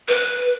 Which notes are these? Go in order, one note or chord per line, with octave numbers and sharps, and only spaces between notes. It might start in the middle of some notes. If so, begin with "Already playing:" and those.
B4